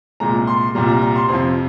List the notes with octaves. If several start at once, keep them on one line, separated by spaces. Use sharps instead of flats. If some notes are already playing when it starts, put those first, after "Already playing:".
C2 A#2 G#3 A#5
C6
C2 A#2 G3 A#5
A#5
A#5
C6
F2 C3 F3